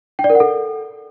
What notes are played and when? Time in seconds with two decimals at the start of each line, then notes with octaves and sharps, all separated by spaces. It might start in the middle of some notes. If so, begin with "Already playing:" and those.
0.19 G5
0.24 D5
0.30 A#4
0.35 F#5
0.40 A4